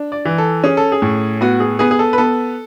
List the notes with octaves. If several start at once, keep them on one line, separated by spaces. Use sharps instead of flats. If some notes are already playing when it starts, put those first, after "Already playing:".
Already playing: D4
D5
E3
A4
C#4 G#4
A4
G#4
A2
B3 F#4
G#4
B3 G#4
G#4
A4
B4
B3 A4